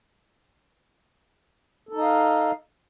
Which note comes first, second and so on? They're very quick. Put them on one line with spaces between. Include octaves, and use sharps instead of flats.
A4 D#4 D#5 F5